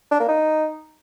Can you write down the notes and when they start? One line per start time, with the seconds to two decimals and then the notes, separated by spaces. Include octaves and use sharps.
0.11 D4
0.20 A#3
0.29 D#4